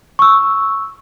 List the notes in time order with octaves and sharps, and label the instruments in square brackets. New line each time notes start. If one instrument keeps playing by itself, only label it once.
[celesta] C#6 E6